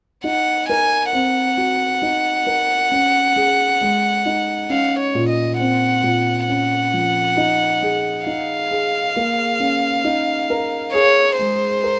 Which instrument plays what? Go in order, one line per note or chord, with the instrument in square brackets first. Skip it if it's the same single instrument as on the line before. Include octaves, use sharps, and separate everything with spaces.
[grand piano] D#4 [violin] F#5
[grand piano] A#4 [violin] G#5
[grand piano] C4 [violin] F#5
[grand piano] F#4
D#4
A#4
C#4
G#4
G#3
D#4
[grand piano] C#4 [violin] F5
[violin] C#5
[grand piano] A#2
[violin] D#5
[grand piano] C4 [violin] F#5
[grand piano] A#2
[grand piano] C#4 [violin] F#5
[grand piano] F3
D#4
G#4
[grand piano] D#4 [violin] F5
[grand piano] G#4
A#3
C#4
D#4
A#4
[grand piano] G#4 [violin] C#5
[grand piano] G#3 [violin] C5
[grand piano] A#4